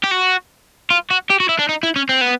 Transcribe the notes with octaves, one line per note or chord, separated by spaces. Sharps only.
G4
F#4
F4
F#4
G4
F#4
E4
D4
D#4
E4
C#4
C4
B3